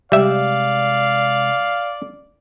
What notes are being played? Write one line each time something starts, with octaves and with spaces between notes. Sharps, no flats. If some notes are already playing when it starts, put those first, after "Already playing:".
C3 G3 G#3 D5 E5 F5